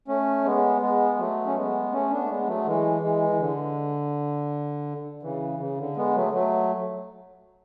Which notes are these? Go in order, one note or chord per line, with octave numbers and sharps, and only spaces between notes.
A3 C#4
G#3 B3
G#3 B3
F#3 A3
C#4
G#3 B3
A3 C#4
B3 D4
A3
G#3 B3
F#3 A3
E3 G#3
E3 G#3
E3
D3
C#3 E3
C#3
D3
G#3 B3
F#3 A3
F#3 A3